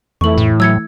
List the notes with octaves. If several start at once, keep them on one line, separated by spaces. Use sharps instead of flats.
F2 E3 A3 E4 C#6 F#7
A2
F#3 E6 G#6 C#7